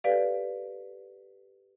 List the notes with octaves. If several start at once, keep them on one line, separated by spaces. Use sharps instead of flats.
G4 A4 B4 D5 F5